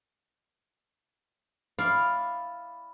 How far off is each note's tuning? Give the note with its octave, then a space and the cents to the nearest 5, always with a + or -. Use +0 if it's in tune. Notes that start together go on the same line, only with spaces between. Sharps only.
E4 +0 D5 -5 F5 +0